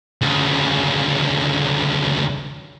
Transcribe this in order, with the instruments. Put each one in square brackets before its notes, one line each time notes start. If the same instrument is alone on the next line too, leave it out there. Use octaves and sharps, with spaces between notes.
[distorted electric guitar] D2 C#3